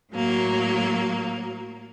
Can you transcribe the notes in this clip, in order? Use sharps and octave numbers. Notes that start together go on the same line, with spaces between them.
A2 F#3 A#3